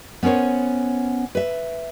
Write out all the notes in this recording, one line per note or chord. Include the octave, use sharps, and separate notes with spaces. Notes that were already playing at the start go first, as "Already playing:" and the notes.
B3 C#4 A#4 C5 C#5
B4 E5